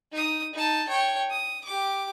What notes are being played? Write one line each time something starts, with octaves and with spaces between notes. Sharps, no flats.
D#4 D#6
D#4 A5
C#5 G5
D#6
G4 D6